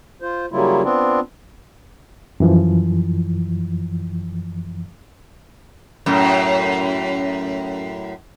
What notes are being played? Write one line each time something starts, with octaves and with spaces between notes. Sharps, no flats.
F4 C5
C#3 F#3 G3 A#3 E4 F4
B3 C4 D4 F4
F#2 E3 F3
F#2 A2